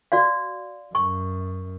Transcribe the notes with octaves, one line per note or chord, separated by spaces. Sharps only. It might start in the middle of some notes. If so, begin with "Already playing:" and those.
F#4 D5 F5
F#2 C#6